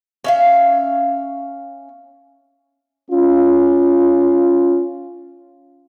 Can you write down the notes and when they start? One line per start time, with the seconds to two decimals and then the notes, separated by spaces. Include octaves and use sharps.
0.24 C#4 E5 F5
3.11 C#4 F4